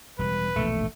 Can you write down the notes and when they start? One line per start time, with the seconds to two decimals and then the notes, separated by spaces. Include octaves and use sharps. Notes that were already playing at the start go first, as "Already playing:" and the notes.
0.19 E1 G3 B4
0.56 E1 A#1 G#2 A3